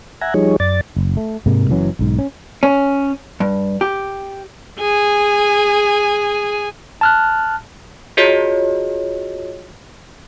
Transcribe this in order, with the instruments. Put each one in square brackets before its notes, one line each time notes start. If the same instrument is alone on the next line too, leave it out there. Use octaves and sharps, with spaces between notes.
[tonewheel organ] E5 F#5 G#5 A#5
F3 G3 D#4 G#4 C#5
F#2 D5 A6
[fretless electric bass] F#1
A3
G#2 C3 G#3 A#3
F#1 E3 F#3 C#4
B1 G#2
C#4
[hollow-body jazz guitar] C#4
G2
G4
[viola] G#4 G#5
[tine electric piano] A5 F6 F#6
[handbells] F4 F#4 G#4 C#5 D#5